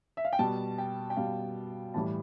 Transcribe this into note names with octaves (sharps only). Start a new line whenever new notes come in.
E5
F5
G5
B2 G3 A5
G5
G5
B2 G3 F5
A2 E3 G3 A5